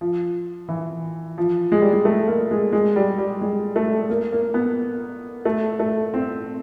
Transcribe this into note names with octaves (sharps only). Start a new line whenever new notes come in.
F3
E3
F3
G#3
G3
G#3
A3
A#3
G#3
G#3
G3
G3
G#3
A3
A#3
A#3
B3
A3
A3
C4